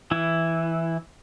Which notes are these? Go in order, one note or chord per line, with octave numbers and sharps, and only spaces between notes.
E3 E4